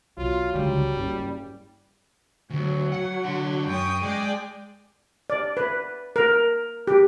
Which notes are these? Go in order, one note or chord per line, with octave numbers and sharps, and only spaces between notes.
B1 F#3 F4
C#2 D3 G3
F#1 G2
D2 F#3
F#5
D3 C6
F#2 G5 C#6 D#6
G#3 G#4 D5 G5
D5
B4
A#4
G4